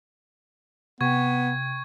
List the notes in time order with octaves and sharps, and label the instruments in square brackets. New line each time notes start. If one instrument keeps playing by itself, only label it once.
[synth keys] C3 G5 [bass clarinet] B3 [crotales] C#6 G#6